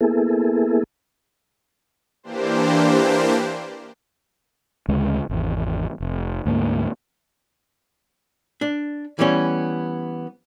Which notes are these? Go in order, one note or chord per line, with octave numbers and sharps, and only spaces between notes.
A#3 B3 E4 G#4 A4
E3 A#3 D4 G4 C5
D2 C#3 G#3
G#1 E2
F1
D2 G#2 A3 A#3
D4
E3 G3 B3 C#4